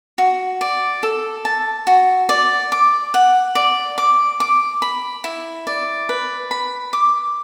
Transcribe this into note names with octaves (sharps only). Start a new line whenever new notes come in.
F#4
D5
A4
A5
F#4
D5
D6
F#5
D5
D6
D6
B5
E4
D5
B4
B5
D6